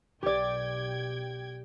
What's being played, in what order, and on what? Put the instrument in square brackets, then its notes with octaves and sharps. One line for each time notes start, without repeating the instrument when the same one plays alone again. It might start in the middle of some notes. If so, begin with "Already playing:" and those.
[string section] B1 G5 G#6 [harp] G4 D5